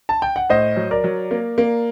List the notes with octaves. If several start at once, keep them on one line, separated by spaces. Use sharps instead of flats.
A5
G5
F#5
A2 C5 D#5
F#3
A#4 D5
F#3
A#3
A#3